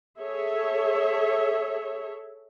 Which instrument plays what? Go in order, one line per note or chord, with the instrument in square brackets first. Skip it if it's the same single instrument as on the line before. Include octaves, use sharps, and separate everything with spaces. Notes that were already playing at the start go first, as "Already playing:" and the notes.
[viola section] G#4 A4 C#5 E5